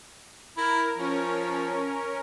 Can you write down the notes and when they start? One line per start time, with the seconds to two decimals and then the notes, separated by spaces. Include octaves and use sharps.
0.57 E4 A#4
0.98 F3 C#4 A#4